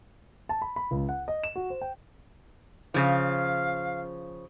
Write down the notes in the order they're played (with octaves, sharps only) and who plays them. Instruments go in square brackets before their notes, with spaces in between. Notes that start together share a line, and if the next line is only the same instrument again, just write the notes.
[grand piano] A5
B5
B5
C#2
F#5
D#5
E7
F#4
C5
G5
[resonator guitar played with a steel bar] C#3 F3 [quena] F5